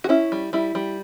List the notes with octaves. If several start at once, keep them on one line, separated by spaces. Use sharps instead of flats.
F#4
C#4 E4
G3
G3 E4
G3